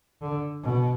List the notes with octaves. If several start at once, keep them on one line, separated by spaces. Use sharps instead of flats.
D3
B2